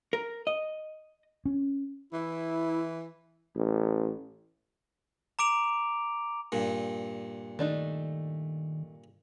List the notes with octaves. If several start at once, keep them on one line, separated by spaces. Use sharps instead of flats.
A#4
D#5
C#4
E3 E4
A1
A#5 D6 D7 F7
G2 A#2
D#3 A3 D4 D#4